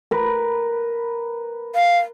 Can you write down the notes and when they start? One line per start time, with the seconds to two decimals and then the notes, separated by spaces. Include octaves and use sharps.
0.11 A#4 B4
1.75 F5